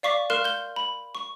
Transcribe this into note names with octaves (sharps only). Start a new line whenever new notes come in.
D5 F5 C#6 D6 B6
A#4 F5 C6 F6 F#6 E7
G6 G7
B5
C#6